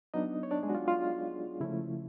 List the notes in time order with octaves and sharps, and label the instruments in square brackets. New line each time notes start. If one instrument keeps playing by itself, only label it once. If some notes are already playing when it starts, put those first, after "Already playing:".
[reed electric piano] F#3 B3 D4 D#4 D#5
C#5
D4 D5
G#3 G#4
F#4
F4
F4
C#3 F3 A3 C#4 E4